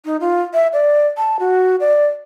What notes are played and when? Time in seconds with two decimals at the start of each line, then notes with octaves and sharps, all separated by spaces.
0.05 D#4
0.21 F4
0.54 E5
0.73 D5
1.17 A5
1.40 F#4
1.80 D5